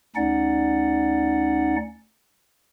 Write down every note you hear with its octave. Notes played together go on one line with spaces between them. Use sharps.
D2 C#4 D#4 D5 F#5